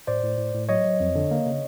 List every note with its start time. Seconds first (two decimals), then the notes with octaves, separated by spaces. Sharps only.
0.07 A2 C5 D5
0.23 A2
0.38 A2
0.54 A2
0.69 F#3 C#5 D#5
0.85 F#3
1.00 F2
1.15 D3
1.31 A#3
1.46 C#3